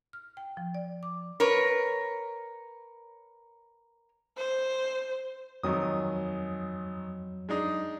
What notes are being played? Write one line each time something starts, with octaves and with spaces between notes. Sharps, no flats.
F6
G5
F3
D5
D6
A#4 B4 C#5
C5
G#1 F2 D#3 F#3 D#6
G#3 D4 D#4